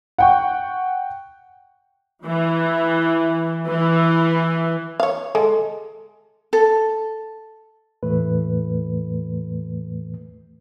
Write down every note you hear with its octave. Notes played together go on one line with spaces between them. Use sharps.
F#5 G5 C#6
E3
E3
C#5 F5
G#3 A4
A4
E2 A2 E3 A3 B4